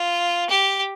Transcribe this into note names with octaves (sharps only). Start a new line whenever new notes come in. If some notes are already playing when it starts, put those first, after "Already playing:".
Already playing: F4
G4